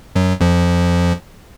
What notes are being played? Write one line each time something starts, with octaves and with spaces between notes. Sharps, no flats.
F#2 F#3
F2 F3